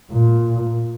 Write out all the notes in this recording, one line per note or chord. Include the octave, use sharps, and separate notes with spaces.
A#2